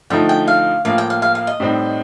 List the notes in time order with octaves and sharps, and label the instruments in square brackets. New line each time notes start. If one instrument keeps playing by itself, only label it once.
[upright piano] D3 F3 A3 D#4 [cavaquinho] G5
[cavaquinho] G5
F5
[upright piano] A2 F3 A#3 [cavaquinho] F5
[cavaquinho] G5
F5
F5
F5
D#5
[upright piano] A2 G3 C4 D#4